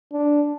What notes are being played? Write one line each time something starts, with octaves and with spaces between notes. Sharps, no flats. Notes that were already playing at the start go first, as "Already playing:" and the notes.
D4